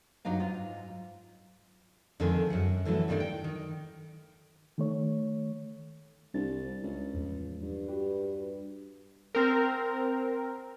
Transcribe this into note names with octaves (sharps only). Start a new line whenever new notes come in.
G2 F#3 D#4 D#5 F5
G#2 F4
F2 D3 D#3 G#3 G#4
F#2 F#5
D3 E3 F#3 A3 C#4
G2 D3 D#3 G3 D4 D#4
G5
D#3
D#3 A3 C#5
C2 G3 D4 A6
C#2
E2 A2 F3
G2
F#4 G4 B4
C4 A#4